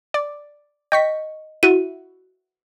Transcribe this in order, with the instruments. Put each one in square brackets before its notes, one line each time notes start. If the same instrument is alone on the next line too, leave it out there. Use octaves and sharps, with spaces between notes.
[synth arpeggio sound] D5
[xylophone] D#5 [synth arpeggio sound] G5 C#6 B6
[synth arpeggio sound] E4 F#4 [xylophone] D#7